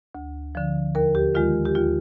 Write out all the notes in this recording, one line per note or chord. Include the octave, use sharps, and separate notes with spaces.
D2
D3 F3
D#2 A#4
G4
D#3 G#3 F4
G4
D#2 F4